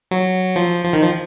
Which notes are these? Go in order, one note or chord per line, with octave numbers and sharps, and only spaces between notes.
F#3
F3
F3
D#3
F3